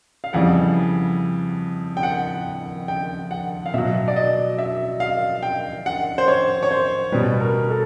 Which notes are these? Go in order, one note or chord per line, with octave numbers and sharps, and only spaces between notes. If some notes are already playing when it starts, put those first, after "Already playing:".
F5
F2 C#3 E3 G3 F#5
G5
F#5
G5
F#5
F5
B2 F#3 E5
D5
D#5
E5
F5
G5
F#5
C5
C#5
C#5
C5
B2 G3 B4
A#4
A4